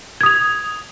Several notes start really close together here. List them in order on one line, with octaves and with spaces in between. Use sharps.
G#6 D#6 F7